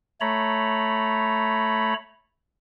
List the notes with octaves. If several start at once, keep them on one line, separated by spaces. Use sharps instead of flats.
A3 C#5 A#5 B5